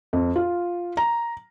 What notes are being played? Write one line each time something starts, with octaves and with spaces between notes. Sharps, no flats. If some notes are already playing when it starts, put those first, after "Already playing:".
F2
F4
A#5